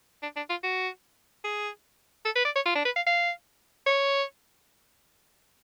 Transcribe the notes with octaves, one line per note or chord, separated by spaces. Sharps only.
D4
D4
F4
F#4
G#4
A4
B4
D5
C#5
F4
D4
B4
F5
F5
C#5